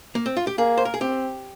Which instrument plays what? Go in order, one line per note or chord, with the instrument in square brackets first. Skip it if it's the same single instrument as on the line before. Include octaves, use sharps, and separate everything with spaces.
[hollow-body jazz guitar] A#3
C4
F4
G4
[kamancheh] A#3 [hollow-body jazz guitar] G#4
[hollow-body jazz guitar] C5
A#4
G#4
[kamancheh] C4 [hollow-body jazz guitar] G4